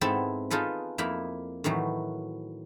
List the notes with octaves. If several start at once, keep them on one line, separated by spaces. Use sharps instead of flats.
G#2 B3 C4 E4 A4 A5
D#4 F4 G#4 A4 B4
F2 A#3 D#4 E4 B5
A2 D#3 E3 F#3